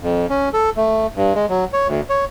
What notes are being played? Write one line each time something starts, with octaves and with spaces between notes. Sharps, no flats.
F2
C#4
A4
A3
G2
G#3
F#3
C#5
D2
C#5